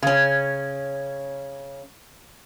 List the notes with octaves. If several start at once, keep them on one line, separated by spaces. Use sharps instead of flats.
C#3 C#4